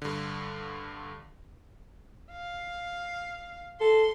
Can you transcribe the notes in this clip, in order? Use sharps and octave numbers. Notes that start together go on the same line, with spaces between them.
G2 D3
F5
A4 C6